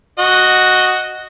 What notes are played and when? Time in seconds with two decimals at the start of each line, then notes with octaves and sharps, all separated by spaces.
0.19 F#4 D#5